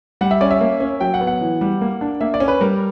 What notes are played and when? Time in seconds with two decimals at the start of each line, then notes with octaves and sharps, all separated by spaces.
0.21 G3 F#5
0.31 E5
0.41 C#4 D5
0.51 E5
0.61 A#3
0.80 C#4
1.00 F#3 G5
1.14 F#5
1.21 B3
1.27 F#5
1.41 E3
1.61 G3
1.81 A#3
2.01 D4
2.21 A#3 E5
2.34 D5
2.40 C#4
2.48 B4
2.61 G3 A#4